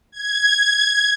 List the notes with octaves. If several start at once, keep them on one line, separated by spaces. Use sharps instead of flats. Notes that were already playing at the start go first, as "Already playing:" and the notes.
G#6